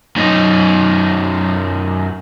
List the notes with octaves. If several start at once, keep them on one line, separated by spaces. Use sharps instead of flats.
F#2 D#4